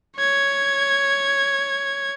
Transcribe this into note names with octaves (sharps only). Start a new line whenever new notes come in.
C#5 G#6